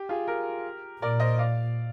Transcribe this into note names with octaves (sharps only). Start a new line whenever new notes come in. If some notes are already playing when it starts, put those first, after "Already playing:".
Already playing: G4
F4 G#4
G4 A#4
A#2 A#4 D5
C5 D#5
D5 F5